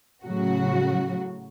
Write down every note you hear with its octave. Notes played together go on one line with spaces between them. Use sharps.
A2 C#3 F#3 F#4